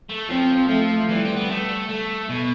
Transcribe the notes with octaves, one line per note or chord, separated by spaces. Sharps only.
A3
F3 C4
F3 A3
E3 G3
C4
B3
A3
A3
B2